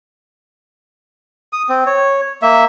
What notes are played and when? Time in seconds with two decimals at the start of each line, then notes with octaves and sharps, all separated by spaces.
1.53 D#6
1.69 C4
1.86 C#5
2.42 A#3 E5